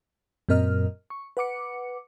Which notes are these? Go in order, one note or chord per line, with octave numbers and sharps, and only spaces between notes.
F#2 A#2 C4 A#4 D#5 F6
C#6
B4 F#5 D6 C#7